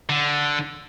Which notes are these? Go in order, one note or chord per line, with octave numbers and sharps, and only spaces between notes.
D3